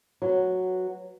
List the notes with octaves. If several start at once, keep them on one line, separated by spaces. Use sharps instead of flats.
F#3 B3